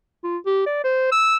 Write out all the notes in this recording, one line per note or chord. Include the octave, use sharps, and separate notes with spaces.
F4
G4
D5
C5
E6